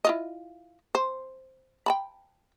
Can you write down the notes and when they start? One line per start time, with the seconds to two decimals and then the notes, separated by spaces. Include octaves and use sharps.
0.05 E4 F4 D#5
0.95 C5
1.86 G5 A5 B5